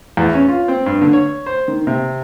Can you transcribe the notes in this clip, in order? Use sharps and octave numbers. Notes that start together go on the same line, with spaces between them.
E2
C#4
F4
C4
G2
D3
C#5
C5
D#3
C3